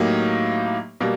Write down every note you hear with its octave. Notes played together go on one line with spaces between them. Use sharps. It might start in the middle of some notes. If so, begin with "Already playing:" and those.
Already playing: A2 F#3 A#3 D#4 G4
B2 G3 A#3